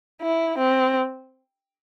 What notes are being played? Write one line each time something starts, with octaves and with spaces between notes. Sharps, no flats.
E4
C4